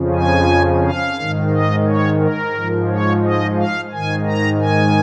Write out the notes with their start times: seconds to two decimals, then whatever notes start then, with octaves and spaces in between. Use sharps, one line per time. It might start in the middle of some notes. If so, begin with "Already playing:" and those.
Already playing: F2 C#3 F3
0.14 G#5
0.83 F5
1.18 G#2 D#3
1.51 D#5
1.86 C#5
2.20 A#4
2.54 G#2 F3
2.89 C#5
3.23 D#5
3.57 F5
3.91 G#2 D#3 G#5
4.26 A#5
4.59 G#5